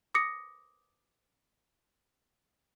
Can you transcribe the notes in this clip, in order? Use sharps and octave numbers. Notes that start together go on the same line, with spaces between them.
D6 D#6 A#6 C#7